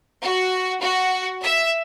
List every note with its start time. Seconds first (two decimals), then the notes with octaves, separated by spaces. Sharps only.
0.21 F#4
0.80 F#4
1.42 E5